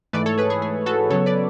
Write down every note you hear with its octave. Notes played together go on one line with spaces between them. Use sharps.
G#2 E3 A3 B4 D5
A4 C#5
G#4 B4
G#4
G#4
F#4 A4
C#3 F#3 B3 A4 C#5
B4 D5